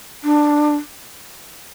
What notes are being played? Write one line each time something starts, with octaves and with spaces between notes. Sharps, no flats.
D4